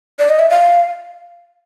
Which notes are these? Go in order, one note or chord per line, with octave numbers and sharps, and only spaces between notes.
D5
D#5
E5
F5